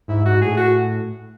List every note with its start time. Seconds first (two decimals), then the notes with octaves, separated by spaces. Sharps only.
0.08 G#2 E4
0.25 G#2 F#4
0.41 A2 G#4
0.57 F#4